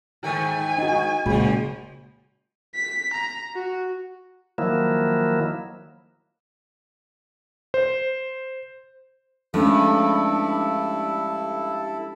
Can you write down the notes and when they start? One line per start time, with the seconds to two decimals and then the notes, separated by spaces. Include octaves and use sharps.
0.24 G#2 D#3 A3 G#5
0.78 D#4 F#4
1.26 F#2 A#2 C#3 F3 G#3 F#4 B5
2.75 B6
3.13 A#5
3.55 F#4
4.58 D#3 F3 F#3 A#3 E4
7.74 C5
9.54 G2 F3 G#3 A3 C#4 E4 A4